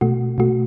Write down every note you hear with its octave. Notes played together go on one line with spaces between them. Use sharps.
B2 A3 F#4
B2 A3 F#4